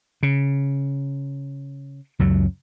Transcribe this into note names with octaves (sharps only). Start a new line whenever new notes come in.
C#3
C#2 F#2 F#3